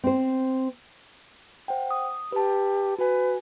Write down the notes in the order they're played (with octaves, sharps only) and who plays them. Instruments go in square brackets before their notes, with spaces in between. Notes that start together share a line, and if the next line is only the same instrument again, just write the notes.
[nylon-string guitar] C4 C5
[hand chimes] C5 F#5 G5
D#6
[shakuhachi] G4 [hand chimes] B4 A5
[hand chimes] F#4 G#5 [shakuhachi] B4